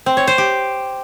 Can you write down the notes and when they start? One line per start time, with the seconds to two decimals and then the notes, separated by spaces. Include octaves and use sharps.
0.06 C4
0.17 C#5
0.27 C5
0.38 G4